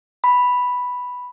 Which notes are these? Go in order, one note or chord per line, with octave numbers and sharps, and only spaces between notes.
B5